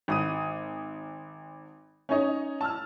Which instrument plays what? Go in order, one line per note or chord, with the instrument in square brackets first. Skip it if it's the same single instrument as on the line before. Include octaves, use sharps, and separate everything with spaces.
[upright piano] G#1 D#6 D#7
C#4 D#4 C#5 D#5
A5 E6 F6